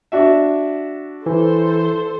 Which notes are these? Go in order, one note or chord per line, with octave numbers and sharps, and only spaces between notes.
D4 F#4 E5
E3 A4 C5